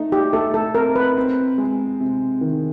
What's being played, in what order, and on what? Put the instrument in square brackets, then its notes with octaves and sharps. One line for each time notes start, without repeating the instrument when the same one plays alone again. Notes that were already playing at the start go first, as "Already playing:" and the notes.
Already playing: [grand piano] A3 D#4
[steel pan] G4
[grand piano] A3 [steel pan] A4
[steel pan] A4
[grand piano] C4 [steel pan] A#4
[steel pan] B4
[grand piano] C4
G#3
C3
D#3